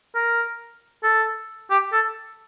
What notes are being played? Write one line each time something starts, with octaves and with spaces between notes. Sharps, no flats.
A#4
A4
G4
A4